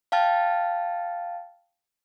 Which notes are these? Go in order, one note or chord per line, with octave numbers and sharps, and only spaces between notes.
F5 G5 A5 F6 A6